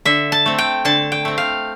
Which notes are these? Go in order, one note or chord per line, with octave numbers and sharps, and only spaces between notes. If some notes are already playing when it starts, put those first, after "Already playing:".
D3 E5
A5
A3 C4
G5
D3 A5
G5
A3 C4
F5